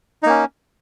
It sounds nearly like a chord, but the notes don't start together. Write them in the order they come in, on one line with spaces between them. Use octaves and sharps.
D#4 A#3 C#4